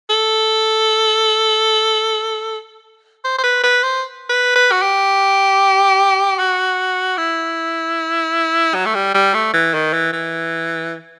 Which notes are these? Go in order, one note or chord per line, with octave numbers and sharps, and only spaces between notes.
A4
C5
C5
B4
B4
C5
B4
B4
F#4
G4
F#4
E4
F#3
A3
G3
G3
A3
E3
D#3
E3
E3